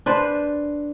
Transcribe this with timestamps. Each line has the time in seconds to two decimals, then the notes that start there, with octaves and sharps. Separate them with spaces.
0.06 D4 B4 C5